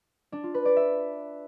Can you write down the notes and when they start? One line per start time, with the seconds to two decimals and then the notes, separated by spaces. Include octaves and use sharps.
0.32 D4
0.43 F4
0.54 B4
0.65 D5
0.76 E5